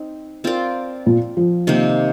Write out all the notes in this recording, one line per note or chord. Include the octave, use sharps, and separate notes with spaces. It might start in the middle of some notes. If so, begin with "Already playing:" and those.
Already playing: C4 D#4
C4 F4 A#4 D5
A#2
F3
C3 D#3 A#3